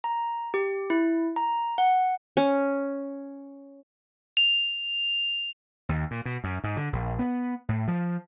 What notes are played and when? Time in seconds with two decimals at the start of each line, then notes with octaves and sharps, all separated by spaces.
0.04 A#5
0.54 G4
0.90 E4
1.36 A#5
1.78 F#5
2.37 C#4
4.37 F7
5.89 D#2
6.11 A#2
6.25 B2
6.44 F#2
6.64 G#2
6.77 D3
6.93 A#1
7.19 B3
7.69 A2
7.88 F3